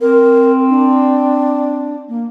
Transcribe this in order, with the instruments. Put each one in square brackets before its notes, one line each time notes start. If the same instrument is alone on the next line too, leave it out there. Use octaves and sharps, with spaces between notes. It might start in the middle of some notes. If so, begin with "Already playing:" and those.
[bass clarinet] C4 [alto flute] A#4
[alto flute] D4
A#3